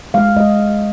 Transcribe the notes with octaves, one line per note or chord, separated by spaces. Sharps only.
G#3 F5
G#3 D#5